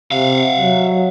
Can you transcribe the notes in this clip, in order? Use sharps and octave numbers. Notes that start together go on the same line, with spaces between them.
C3 E5 F5
F#3